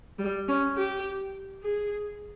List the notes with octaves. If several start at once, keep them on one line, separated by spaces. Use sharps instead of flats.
G3
C#4
G4
G#4